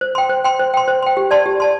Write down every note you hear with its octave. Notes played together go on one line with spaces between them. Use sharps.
C5
G5 C6
C5
G5 C6
C5
G5 C6
C5
G5 C6
G4
D5 A5 C6
G4
D5 A5 C6